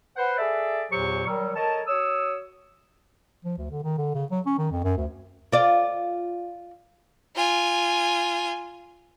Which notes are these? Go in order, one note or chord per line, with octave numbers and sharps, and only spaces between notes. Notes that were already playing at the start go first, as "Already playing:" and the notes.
B4 C5 F#5
G#4 A4 D5 E5
E2 A#2 F#3 G4 C5 C#6
D#3 F#3 G3
A4 A#4 C#5 D#5 A5
F#4 C#5 D#6 E6
F3
D2
D3
D#3
D3
C#3
F#3
C#4
D#3
F2
F#2
D2
F4 D5
F4 G#5